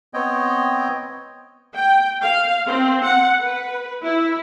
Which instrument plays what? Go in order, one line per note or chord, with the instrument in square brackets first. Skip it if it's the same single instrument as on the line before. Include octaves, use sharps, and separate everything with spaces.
[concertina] B3 C4 C#5 D#5 G5
[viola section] G5
F5
C4
F#5
B4
E4